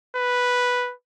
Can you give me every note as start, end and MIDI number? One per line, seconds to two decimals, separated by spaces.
0.16 0.93 71